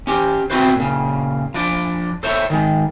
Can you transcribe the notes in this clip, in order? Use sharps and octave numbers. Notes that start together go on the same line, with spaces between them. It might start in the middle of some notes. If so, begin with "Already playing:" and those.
C#4 G4
C4 D#4 E4 F#4 B4 C5
A#2 C#3
F3 D4 D5
A4 C5 C#5 E5
D#3 G#3